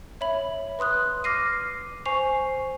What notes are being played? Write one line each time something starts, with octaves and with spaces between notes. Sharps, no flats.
C#5 E5 B5 F#7
B4 C6 D#6 F#6
D6 F6 A#6 C7 D#7
C5 G#5 C#6 C7 F7